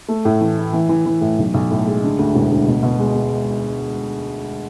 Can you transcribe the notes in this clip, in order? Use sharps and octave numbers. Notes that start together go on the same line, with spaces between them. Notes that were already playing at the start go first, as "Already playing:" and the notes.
A3
A2
E3
E4
E3
E3
E3
A2
B1
B1
A2
G#3
D3
D2
E1
D2
B2
B2
G#3
G#3